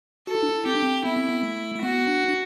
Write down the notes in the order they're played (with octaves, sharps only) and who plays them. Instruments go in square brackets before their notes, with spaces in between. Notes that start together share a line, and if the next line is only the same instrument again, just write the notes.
[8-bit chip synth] F#4 [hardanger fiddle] A4
[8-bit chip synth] E4
D4
E4
[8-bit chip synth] C4 [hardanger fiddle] G4
[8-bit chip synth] D4
C4
[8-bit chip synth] B3 [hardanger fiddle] E4
[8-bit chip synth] C4
B3
A3
A3
[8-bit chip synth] B3 [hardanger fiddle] F#4
[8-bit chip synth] D4
D4